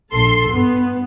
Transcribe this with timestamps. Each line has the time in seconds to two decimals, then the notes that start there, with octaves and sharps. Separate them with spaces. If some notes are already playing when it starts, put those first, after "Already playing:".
0.11 A#1 A4 C6 C7
0.50 G2 B3